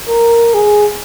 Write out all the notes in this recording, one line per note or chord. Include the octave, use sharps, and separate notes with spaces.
A#4
G#4